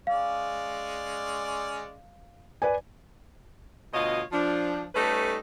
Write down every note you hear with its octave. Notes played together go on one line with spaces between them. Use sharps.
G#3 C#4 D5 F5
B4 D5 G#5
D2 B2 F4 C#5 D#5
F3 D4
G3 A3 C#4 D#4 A4 B4